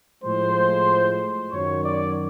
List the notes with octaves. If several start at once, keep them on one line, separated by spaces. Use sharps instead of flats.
A2 F3 G#3 C5
F#2 D#3 F#3 C#5
D5